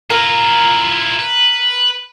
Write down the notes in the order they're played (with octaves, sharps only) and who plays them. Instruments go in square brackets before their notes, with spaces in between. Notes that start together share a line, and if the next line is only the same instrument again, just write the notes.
[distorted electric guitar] E4 F4 [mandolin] A#4
[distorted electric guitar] B4